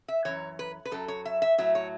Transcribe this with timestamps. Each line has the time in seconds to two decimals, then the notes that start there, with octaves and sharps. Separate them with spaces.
0.08 E5
0.25 F#2 E3 C#5
0.59 B4
0.85 B4
0.91 F#2 F#3 A4
1.08 C#5
1.25 E5
1.42 E5
1.58 A2 F#3 E5
1.75 C#5